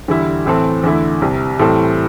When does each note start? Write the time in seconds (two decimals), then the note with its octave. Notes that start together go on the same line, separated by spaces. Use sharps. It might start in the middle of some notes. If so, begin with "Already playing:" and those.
0.08 E2 D3 G3 E4
0.45 A2 E3 C4 A4
0.83 E2 D3 A3 E4
1.21 C2 C3 G3
1.59 A2 E3 G3 C4 A4